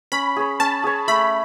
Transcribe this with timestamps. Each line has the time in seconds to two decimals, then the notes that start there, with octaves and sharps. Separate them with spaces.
0.12 C#4 B5
0.36 G#4 C#5
0.60 C#4 A5
0.84 G#4 C#5
1.08 A3 B5